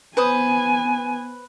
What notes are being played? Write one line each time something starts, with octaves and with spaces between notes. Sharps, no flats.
B3 B4 C5 G#5 D#6